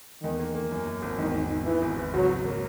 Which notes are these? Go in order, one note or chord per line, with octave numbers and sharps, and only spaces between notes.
E2 D#3
A#3
A#3
F#2
F#2
G#1
E2 D#3
E2
E2
E3 B3
G#1
G#1
C#2 F#3
F#3
A#3